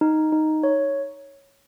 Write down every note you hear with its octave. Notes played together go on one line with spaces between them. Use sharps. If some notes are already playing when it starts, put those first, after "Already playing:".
D#4
D#4
C#5